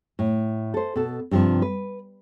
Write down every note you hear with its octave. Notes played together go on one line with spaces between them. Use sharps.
A2
A4 C5
B2 A4
G2 C3 D#3 F3
B4